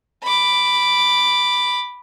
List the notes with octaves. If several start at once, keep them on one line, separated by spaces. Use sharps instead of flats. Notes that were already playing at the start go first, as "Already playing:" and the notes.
B5 D6